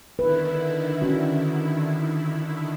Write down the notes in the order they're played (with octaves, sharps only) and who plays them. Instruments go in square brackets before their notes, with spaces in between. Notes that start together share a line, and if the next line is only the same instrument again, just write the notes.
[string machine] D3 D#3 E4 [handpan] B4
[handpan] C#4 F#4